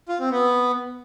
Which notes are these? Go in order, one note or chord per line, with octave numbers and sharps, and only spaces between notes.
F4
C4
B3